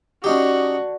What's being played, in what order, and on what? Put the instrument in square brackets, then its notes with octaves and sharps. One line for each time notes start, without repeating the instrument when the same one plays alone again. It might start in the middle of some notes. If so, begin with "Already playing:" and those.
[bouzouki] D3 [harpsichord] C#4 D#4 G4 [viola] F#4